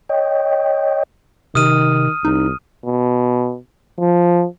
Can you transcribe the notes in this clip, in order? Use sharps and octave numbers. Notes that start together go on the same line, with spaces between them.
C#5 D#5 G5
C3 D#3 D#6 F6 D#7
C2 D#4
B2
F3